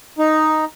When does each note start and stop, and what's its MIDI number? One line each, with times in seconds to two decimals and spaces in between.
0.18 0.65 63